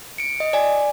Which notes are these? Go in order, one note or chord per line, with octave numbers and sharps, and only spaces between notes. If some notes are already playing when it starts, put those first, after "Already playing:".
C#7 D7
D#5
D5 G#5